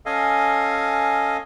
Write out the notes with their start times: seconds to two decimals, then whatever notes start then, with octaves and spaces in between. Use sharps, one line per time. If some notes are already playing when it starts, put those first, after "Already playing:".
0.06 C#4 A4 D#5 F5 G#5